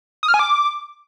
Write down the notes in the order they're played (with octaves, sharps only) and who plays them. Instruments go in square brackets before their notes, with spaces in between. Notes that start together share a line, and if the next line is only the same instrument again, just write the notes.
[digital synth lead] D#6
F6
G#5
D6